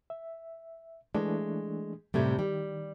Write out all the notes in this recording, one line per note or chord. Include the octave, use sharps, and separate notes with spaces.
E5
E3 G#3 A3 D4
F#2 A2 C3 G3 A3 G#6
D#3 G3